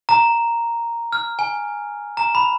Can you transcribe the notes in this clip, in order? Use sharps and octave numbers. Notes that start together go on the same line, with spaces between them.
A#5
F6
G#5
A#5
B5